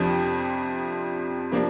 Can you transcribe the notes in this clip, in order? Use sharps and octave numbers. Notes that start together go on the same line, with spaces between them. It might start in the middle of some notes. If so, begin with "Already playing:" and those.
Already playing: F2 C3 F3 D4
C3 F3 A#3 D4